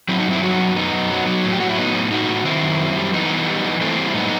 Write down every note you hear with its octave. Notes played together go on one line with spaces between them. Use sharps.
F#3 C4 E4
D#4 F#4
G2 C4 E4
F#3 D#4 F#4
F#2
F#2 B3 D#4
F#2
F#3
F#3
A2
G4
F#3 F#4
E4
A2 B3 D#4
A2
A2 D#4 F#4
A2
D#3 C4 E4
F#2
F#2
G3
E3 B3 D#4
E3
G3
E3
E3 A3 C4
G3
E4
A2 B3 D#4